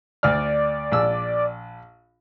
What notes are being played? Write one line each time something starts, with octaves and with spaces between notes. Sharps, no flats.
D2 D5 F6
A#1 E6